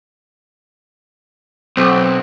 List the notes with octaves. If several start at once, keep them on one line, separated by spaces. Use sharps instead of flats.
B1 C4